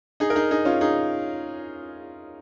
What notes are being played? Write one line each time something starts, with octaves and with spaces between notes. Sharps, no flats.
D#4 G#4
A#4
D#4 G#4
D#4 G#4
C#4 F4
D#4 G#4